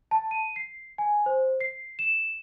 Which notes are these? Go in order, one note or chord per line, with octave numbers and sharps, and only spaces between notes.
A5
D#7
C7
G#5
C5
C7
E7